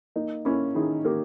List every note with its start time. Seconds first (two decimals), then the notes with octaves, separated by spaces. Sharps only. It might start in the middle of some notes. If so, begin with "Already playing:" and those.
0.16 A#3 D#4
0.45 A#3 C#4 E4
0.75 D#3 E4 G#4
1.04 A#3 G4 A#4